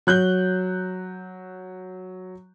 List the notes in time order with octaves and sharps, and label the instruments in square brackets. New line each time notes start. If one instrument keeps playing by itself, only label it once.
[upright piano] F#3 F#6 G6 G7